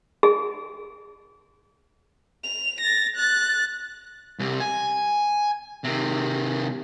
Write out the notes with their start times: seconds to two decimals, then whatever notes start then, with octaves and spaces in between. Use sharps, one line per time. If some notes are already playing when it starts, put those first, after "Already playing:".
0.23 G#4
2.44 F7
2.81 A6 A#6
3.16 F#6 A6
4.39 C2 C3
4.60 G#5
5.84 C3 D#3